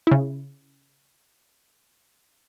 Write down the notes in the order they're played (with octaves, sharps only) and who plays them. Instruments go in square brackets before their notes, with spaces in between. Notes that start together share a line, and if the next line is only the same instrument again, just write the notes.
[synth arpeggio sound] C#3 E4